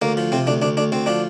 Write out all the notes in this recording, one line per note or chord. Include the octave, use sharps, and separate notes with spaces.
D2 A#3
F3
C3 C4
D2 D4
D2 D4
D2 D4
D2 C4
F3 D4